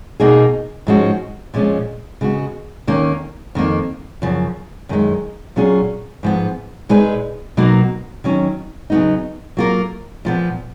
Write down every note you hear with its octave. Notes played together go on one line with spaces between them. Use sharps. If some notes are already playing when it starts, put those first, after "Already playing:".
B2 A#3 D#4 G#4
G#2 F3 G#3 C#4 F#4
A#2 F3 G#3 C#4
C#3 G#3 B3 F#4
D#2 D#3 A#3 C#4
F2 D#3 A#3
F#2 C#3 F3
F#2 D#3 G#3
A#2 F#3 C#4 F4 G#4
G#2 F3 B3
A#2 G#3 D#4 G#4 B4
B2 F#3 A#3 D#4 F#4
D#3 F#3 C#4
C#3 F#3 B3 D#4
F#3 A#3 F4 A#4
A#2 F3 B3